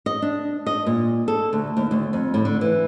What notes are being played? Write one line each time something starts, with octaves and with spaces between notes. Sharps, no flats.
D#5
D4
D#5
A#2
A4
D2
D#2
D2
F2
A2
D3
E3